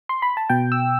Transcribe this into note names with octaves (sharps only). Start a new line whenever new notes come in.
C6
B5
A5
B2 G5
E6